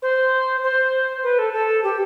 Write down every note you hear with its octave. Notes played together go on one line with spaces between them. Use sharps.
C5
C5
B4
A4
A4
G4